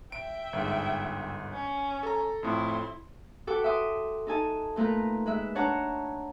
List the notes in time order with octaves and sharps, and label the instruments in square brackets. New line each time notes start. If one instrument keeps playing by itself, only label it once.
[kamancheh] E5 G5 [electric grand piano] D7
[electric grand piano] G1 G#2
[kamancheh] C#4
[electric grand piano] A4 A#5
[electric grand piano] F2 A2 [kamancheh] E4 C6
[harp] F#4 A4 B4 G5 D6
E5 G5 C6 D6 D#6
D#4 A4 G#5 A5
A#2 A3 A#4 B4 A#5
G#3 B4 E5
D4 C#5 F#5 A5 A#5